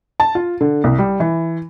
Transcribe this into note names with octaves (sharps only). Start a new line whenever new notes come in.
A5
F4
D3
C2
G3
E3